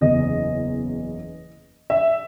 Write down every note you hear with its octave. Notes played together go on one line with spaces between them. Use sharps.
F#1 E2 C#3 D#5
E5